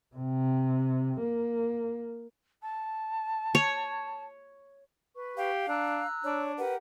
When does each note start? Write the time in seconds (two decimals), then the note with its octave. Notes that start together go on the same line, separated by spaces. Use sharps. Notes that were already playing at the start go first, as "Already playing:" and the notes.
0.16 C3
1.20 A#3
2.62 A5
3.55 C#5
5.16 B4 C#6
5.37 G4 F5
5.68 D4 A#5 E6 F#6
6.24 D4 C#5
6.58 G4 A#4 B4 F#5